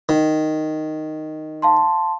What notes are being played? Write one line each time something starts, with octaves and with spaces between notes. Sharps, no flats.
D#3
F5 A5 C6